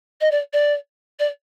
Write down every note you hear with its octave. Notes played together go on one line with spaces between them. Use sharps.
D#5
D5
D5
D5